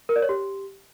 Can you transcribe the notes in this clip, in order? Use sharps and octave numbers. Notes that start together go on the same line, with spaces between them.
A#4
D5
C#5
G4